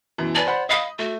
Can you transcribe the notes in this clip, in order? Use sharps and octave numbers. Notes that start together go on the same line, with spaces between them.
F#2 B2 E3
B4 D5 G#5 A5
C5 F#5 B5
D#5 F5 B5 D#6
A3 F#4